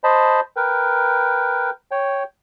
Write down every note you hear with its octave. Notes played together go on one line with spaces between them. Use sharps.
C5 D#5 A5 B5
A#4 B4 G5
C#5 G5